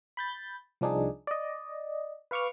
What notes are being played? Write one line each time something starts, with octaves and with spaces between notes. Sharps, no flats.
B5 G6 A6
C2 F3 D4 D#4 G#4
D5 D#5
B4 F5 C#6 D6 F6